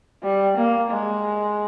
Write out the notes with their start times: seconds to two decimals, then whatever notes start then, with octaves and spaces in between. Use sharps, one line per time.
0.23 G3
0.57 A#3
0.91 G#3